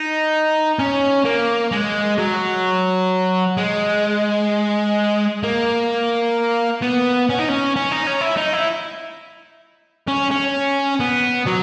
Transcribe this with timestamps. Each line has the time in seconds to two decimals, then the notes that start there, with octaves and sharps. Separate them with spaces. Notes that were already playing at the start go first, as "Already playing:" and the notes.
Already playing: D#4
0.79 C#4
1.25 A#3
1.72 G#3
2.18 F#3
3.57 G#3
5.43 A#3
6.82 B3
7.30 C#4
7.39 D#4
7.49 C#4
7.76 C#4
7.92 D#4
8.07 C#4
8.21 E4
8.37 D#4
8.53 E4
10.08 C#4
10.31 C#4
11.00 B3
11.46 F#3